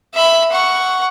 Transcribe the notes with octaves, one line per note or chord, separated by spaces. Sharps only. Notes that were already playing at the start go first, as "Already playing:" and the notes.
E5 B5
F#5 C#6